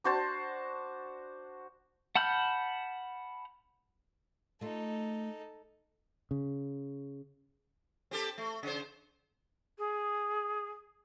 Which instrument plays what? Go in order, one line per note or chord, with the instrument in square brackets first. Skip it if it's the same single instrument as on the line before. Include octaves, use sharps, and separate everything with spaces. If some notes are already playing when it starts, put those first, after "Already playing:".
[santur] D4 F#4 C5 A5
[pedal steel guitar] F#5 A5 B5 F6 G6
[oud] A3 F4 [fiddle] D#4 A4
[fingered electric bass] C#3
[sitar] C4 G4 A4
A3
C#3 C5
[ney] G#4